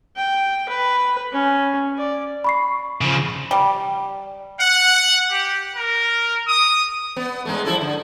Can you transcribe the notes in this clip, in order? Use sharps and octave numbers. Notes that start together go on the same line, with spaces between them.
G5
B4
C#4
D5
B5 C#6 C7
C#3 F3
G3
F#5
G4
A#4
D#6
B3
G2 G#3 A3
F3 E4 A4
D3